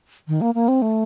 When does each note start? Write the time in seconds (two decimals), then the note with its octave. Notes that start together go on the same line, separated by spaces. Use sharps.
0.28 D#3
0.41 A#3
0.54 A#3
0.68 C4
0.82 A3